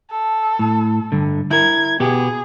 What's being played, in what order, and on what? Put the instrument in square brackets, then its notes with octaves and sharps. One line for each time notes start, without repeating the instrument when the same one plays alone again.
[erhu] A4
[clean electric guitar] A2
G2 D3
[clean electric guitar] E4 A#4 [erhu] G#6
[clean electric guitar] B2 B3 G4 [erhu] G#4